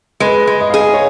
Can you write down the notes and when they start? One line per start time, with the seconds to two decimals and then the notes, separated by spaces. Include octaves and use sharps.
0.20 G#3 B4
0.47 G#3
0.61 D#5
0.70 G#4 F5
0.79 D#5
0.94 C#5